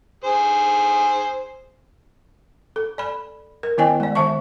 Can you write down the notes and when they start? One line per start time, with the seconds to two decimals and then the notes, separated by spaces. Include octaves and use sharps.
0.24 G#4 C5
2.76 A4
2.98 D5 B5
3.63 A#4
3.78 D#3 B3 E4 D#5 G5 G#5
4.00 G#3 D5
4.15 D#3 E5 A5 C#6